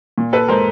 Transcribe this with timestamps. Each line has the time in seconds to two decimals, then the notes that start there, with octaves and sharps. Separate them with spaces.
0.18 A#2
0.33 A4 B4
0.48 G#3 A#4 C5